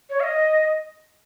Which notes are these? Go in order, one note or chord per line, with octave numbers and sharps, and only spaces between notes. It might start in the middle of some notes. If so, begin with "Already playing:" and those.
C#5
F5
D#5